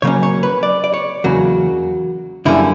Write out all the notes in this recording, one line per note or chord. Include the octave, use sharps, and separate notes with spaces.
C#3 F#3 A#3 C#4 C#5
C#5
B4
D5
D5
C#5
E2 C#3 F#3 A#3 F#4
F#2 D3 G3 A#3 C#4 E4